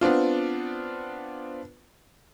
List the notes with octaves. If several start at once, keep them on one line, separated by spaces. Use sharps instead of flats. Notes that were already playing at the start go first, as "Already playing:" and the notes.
B3 C4 D4 F4